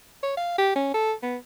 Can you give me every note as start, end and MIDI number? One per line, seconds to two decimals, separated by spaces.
0.23 0.36 73
0.37 0.55 77
0.58 0.72 67
0.75 0.92 61
0.94 1.13 69
1.23 1.37 59